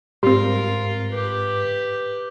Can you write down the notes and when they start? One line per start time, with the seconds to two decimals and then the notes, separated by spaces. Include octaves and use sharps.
0.23 G#2 G3 C4 F4 A#4 C6
1.10 G4 B4